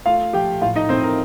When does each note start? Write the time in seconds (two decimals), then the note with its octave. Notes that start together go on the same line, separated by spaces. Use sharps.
0.06 A3 F4 F5
0.33 F3 G4 G5
0.62 A2 F4 F5
0.76 D#4 D#5
0.89 A2 C4 C5
1.03 A#4